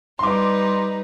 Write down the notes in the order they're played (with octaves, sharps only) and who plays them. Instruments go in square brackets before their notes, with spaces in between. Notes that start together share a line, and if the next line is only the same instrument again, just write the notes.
[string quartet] G3 D#4 B4 [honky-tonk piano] C6 D6